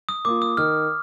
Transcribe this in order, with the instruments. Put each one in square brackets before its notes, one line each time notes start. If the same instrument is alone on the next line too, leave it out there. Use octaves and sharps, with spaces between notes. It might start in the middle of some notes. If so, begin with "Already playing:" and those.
[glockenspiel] D#6
[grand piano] A#3 F4 [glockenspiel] D6
[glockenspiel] D#6
[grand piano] D#3 [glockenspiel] F6